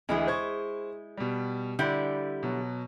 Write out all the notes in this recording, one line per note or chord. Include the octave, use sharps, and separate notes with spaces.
D2 E3 G#3 E4 G#4
C5 C#6 G#6
B2 G3
D3 G3 E4 G6
B2 F#3